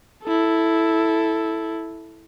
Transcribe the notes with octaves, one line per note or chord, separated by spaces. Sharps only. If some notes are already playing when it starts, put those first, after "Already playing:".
E4 A4